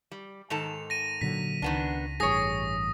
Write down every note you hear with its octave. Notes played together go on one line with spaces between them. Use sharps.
G3
G#2 D#3 A4 F7
A#6 D#7
A#2 D3 F#3 B6
C#2 D#3 B3 D4
A1 G2 G#4 C#5 D#6 A#6